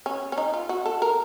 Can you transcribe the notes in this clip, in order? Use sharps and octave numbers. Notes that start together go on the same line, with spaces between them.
C#4
C#4
D#4
F4
F#4
A4
A#4